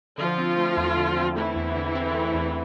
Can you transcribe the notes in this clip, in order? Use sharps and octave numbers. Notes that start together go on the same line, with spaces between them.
D3 F3 F4
C4
A3
E2
D3
C4
E3 A3 E4
E2
D3
C4
A3
E2